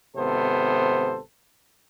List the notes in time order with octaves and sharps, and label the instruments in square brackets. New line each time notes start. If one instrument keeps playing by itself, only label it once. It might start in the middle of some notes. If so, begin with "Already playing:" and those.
[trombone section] G#1 C3 B3 A4 C5